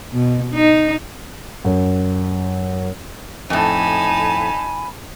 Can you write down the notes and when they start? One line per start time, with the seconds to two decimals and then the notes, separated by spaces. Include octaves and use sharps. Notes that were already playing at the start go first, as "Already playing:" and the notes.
0.12 B2
0.54 D#4
1.65 F#2
3.50 F2 A2 D#4 G#5 A5 B5